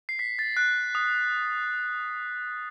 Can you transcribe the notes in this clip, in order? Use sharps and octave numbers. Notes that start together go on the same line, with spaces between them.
C7
B6
A6
F#6
D#6